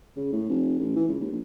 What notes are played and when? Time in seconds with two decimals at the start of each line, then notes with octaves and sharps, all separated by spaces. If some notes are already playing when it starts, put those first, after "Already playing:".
0.17 C#3
0.33 A2
0.49 F1
0.79 A1
0.96 E3
1.08 C#2
1.20 D#2
1.32 A#1